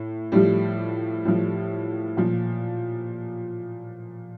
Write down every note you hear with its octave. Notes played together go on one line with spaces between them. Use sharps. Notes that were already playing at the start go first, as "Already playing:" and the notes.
Already playing: A2
A2 F3 G3
A2 F3
A#2 F3